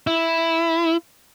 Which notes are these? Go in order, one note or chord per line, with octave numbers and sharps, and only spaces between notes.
E4